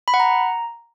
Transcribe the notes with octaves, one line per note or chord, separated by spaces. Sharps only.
B5
F#5
A#5